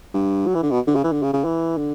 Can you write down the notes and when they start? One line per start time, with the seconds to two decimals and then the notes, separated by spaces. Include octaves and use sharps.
0.14 G2
0.47 F#3
0.55 E3
0.63 D3
0.71 B2
0.87 D3
0.95 C#3
1.04 E3
1.12 D3
1.23 C#3
1.33 C#3
1.45 E3
1.77 D3